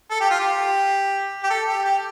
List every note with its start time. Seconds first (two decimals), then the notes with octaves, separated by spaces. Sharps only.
0.10 A4
0.21 G4
0.30 F4
0.40 G4
1.43 G4
1.50 A4
1.68 G4
1.85 G4